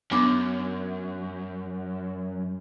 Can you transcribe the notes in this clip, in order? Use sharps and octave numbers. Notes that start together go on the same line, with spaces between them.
F#2 B3 D4 D6